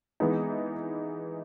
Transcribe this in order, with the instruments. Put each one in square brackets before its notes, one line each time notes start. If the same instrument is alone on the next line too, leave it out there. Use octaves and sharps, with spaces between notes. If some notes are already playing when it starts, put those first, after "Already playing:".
[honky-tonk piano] E3 G#3 B3 D#4